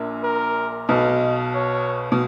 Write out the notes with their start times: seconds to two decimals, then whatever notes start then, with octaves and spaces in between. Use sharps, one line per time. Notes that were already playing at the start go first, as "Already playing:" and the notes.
Already playing: A#1 A#2
0.23 A#4
0.89 B1 B2 D#5
1.55 C#5
2.12 B2